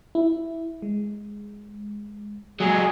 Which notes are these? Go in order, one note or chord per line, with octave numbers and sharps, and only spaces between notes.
E4
G#3
F#3 G#3 G#4